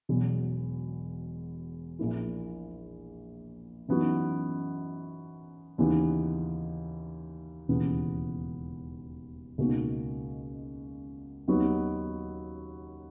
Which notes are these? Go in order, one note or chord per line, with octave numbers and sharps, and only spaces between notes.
E1 E2 B2 F#3
A#1 A#2 A#3 E4
F#2 E3 B3 D#4 F#4
D#2 C#3 E3 B3 D#4
E1 D#2 C#3 E3 B3
C#2 B2 A#3 D#4 F#4
D#2 D#3 F#3 B3 F#4